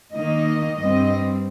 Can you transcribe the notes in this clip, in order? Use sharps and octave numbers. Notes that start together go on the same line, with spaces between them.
D#3 A#3 D#4 D#5
G2 G3 C4 D#5